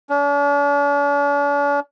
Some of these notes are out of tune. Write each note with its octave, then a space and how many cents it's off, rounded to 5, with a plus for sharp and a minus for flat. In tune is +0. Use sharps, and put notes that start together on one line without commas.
D4 -45